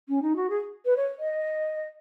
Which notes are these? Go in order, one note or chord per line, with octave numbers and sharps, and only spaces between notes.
C#4
D#4
F#4
G#4
B4
C#5
D#5